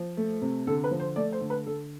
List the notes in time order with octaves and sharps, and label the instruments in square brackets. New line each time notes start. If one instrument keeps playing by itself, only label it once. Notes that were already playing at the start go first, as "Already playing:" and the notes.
Already playing: [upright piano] F3
A3
C3
D3 A4
B4
F3
C5
A3 D5
C5
D3
B4
D3 A4